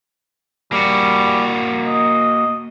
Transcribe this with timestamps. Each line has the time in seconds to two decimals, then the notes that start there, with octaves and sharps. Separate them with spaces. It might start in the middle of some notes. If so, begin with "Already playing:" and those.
0.72 G3 A#3 F#4
1.86 D#5